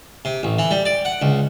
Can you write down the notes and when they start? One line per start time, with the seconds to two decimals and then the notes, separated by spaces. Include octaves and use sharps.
0.25 C3
0.43 A1
0.59 E3
0.71 G3
0.85 D5
1.05 F#5
1.22 C#2